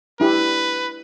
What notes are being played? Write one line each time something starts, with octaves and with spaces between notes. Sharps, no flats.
D4 E4 G4 B4